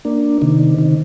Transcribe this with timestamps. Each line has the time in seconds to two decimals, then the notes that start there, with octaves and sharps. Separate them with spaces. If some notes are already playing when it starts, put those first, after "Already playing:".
0.05 A#3 D4
0.42 C3 D#3
0.78 C3 D#3